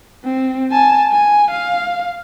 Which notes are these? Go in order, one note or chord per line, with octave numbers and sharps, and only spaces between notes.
C4
G#5 A5
G#5
F5